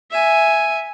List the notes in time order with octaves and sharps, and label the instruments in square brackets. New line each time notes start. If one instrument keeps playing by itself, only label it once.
[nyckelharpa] E5 G#5